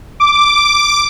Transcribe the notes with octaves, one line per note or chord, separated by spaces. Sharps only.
D6